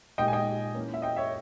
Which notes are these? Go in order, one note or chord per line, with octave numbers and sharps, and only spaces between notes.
A#2 G#3 D#4 G4 D#5 G5
G#5
D#5 G5
E3 A#3 C#4
E5
D#5 G5
C#5 E5